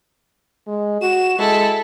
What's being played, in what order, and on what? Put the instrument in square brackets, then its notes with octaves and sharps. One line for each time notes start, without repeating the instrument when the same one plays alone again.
[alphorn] G#3
[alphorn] F#4 [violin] E7
[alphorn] G#3 [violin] E4 A4